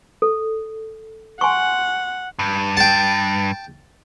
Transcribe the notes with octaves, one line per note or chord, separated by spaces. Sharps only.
A4
F#5 G#5 C6 C#6
G2
G5 A5